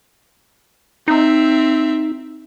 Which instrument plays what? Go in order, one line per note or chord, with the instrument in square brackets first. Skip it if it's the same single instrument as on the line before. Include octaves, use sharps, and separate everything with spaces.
[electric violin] C4 E5 [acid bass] D#4